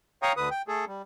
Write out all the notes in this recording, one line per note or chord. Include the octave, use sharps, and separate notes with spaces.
C#5 F5 G5 A#5 C#6 D#6
D2 D3 B4 D#6
G5
A3 G#4 A4
G3